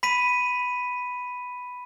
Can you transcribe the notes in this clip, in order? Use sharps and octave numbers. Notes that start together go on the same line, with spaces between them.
B5 B6 D#7